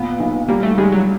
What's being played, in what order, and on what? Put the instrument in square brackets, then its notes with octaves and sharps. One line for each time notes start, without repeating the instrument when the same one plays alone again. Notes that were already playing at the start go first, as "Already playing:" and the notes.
Already playing: [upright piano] A#2 [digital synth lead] B3
[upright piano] B1
[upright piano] G3 [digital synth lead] A#3
[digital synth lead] A3
[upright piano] G3 [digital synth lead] G#3
[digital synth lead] F#3